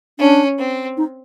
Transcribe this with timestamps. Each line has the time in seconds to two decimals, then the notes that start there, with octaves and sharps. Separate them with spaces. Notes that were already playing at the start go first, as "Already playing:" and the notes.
0.19 C#4 D4
0.58 C4
0.97 D#4